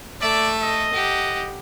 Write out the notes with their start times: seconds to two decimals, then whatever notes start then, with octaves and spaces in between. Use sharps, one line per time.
0.22 A3 D5 E5
0.61 D#5
0.93 G4 F#5